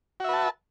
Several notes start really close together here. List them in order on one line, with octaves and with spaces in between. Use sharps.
F#4 E5 B4 A5